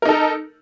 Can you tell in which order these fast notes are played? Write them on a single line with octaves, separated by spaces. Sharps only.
A#4 D#4 A4